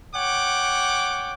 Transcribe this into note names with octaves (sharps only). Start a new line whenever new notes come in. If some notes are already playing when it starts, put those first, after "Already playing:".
C#5 F#5 G5 D6